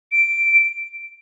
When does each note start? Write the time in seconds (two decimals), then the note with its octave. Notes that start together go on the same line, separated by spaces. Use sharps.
0.12 D7